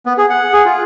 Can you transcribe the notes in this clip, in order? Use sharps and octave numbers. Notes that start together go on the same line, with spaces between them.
B3
G#4
F#5
G#4
F4